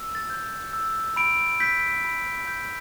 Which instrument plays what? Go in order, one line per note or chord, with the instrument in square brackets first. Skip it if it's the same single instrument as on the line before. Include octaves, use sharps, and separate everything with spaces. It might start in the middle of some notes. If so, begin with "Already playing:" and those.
Already playing: [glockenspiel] E6
A6
G6
E6
B5 D7
G6 B6
B5
G6